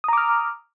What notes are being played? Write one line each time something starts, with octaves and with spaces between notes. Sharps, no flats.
A#5 D6 D#6 F6